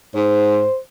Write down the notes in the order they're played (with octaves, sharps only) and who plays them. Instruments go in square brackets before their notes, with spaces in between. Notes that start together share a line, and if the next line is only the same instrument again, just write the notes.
[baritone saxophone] G#2 [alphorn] C5